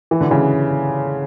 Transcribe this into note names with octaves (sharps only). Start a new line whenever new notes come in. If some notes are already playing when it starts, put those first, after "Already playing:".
E3
D3
C#3 E3